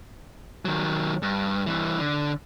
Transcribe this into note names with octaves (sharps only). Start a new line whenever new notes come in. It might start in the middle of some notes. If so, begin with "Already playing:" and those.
D#3 F#3
G2
G2 E3
D3